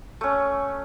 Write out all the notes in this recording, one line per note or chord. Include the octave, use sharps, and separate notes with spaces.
A3 C#4